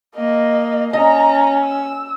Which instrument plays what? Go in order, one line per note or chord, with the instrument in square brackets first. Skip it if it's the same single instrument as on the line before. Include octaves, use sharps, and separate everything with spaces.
[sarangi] A#3 [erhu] D#5
[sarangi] C#4 [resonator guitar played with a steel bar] D#5 [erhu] A#5
[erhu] E6